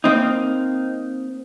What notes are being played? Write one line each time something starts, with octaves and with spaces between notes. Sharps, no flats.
A#3 C4 D#4